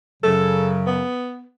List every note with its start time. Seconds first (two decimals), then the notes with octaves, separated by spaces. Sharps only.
0.23 F#2 C#3 F#3 A4
0.86 B3